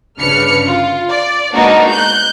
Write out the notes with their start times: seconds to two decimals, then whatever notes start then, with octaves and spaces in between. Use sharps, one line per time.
0.19 G1 C#3 D4 B4 F6 C#7
0.65 F4
1.09 D5
1.54 G#3 A#3 B3 D4 D#4 F#4
1.91 F#6 G6